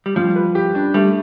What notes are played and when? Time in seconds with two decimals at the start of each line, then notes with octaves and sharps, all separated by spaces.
0.06 G3
0.16 F3 G3
0.36 B4
0.55 G4
0.75 D4
0.94 G3 A3